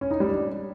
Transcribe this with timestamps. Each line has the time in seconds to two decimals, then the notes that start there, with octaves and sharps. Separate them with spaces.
0.01 C#4
0.11 D#4
0.20 G3
0.30 D4